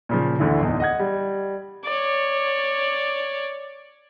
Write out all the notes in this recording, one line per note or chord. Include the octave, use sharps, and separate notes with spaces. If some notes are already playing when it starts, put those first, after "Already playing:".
A#2 C#3 F3
D2 D3 E3
D1 E2 D#4
D#5 F#5 G#6
G3
C#5 D5